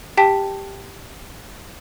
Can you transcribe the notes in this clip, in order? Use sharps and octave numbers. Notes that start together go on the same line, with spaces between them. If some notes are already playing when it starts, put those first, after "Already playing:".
G4 G5 A5 B6